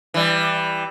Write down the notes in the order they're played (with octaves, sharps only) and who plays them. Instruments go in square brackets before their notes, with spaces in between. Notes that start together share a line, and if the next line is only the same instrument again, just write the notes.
[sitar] E3 G3